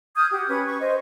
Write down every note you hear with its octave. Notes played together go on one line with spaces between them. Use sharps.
D#6 F6 G6 G#6
F#4 G4
C#4 B4 G#6
C#6
C5 D#5